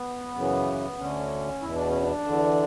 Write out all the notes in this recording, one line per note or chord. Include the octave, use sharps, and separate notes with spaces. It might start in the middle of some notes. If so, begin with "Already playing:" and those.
Already playing: B3
F#2 C#3 E3
D2 D3 C#4
E2 B2 E4
D4
C#4
D4
E2 D3